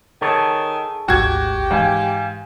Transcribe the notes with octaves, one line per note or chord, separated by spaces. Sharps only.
D#3 G#4 A4 C#5
G#1 D2 F#4 G4 G#6
G#2 E3 F5 G#5